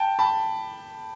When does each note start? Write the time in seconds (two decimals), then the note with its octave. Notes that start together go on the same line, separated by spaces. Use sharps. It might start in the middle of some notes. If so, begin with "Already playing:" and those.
Already playing: G5 A5
0.19 A5 B5